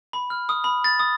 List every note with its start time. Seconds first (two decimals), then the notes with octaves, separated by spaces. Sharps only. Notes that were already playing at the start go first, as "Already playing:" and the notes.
0.13 B5
0.30 F6
0.49 D#6
0.64 B5
0.84 A6
0.99 D#6